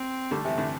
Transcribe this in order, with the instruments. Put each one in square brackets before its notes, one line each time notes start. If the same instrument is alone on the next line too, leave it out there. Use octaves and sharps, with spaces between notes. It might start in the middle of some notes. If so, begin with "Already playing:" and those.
Already playing: [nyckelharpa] C4
[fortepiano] D3 G3 [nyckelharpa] A3
[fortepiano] C3 E3
A2 D3